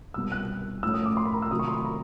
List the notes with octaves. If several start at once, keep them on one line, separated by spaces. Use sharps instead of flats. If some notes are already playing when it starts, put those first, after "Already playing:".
C2 B2 G3 B3 E6
F#6
A2 F3 A3 C#4 E6
D#6
D6
C6
B5
A#5
E6
C3 D#3 F#3 A3 D#6
C#6
C6
B5
A#5